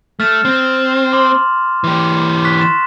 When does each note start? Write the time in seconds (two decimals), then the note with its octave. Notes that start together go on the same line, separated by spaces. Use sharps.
0.20 A3 F6 A6 E7
0.45 C4
1.13 C6 D6
1.84 E3 G4
2.44 C#6 F#6 B6
2.59 C6 A6 E7